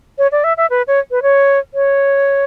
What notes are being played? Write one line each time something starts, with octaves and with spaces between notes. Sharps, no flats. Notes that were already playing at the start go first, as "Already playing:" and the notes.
C#5
D5
E5
E5
B4
C#5
B4
C#5
C#5